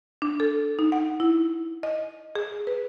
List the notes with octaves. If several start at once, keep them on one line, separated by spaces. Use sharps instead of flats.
D4
A4
D#4
F#5
E4
D#5
G#4
B4